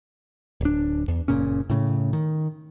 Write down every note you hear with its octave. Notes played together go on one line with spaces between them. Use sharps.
D1 D4
E2
F#1 A#2 C#3 C#4
A2 C#3
D#3